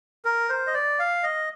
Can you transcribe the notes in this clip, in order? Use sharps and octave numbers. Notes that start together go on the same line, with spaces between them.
A#4
C5
D#5
D5
F5
D#5